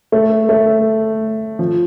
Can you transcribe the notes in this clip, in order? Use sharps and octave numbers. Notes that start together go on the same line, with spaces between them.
A3
A3
F3